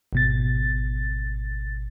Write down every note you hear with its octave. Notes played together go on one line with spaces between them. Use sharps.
G#1 B2 A6